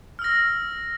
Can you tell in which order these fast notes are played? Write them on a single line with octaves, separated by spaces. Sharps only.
F6 E6 A#6